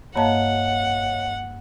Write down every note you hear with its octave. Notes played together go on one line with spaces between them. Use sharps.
G2 A#3 C#5 D#5 F5 F#5 A5